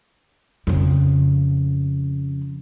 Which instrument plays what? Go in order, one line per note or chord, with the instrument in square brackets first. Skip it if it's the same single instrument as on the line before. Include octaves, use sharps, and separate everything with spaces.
[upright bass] F2 C#3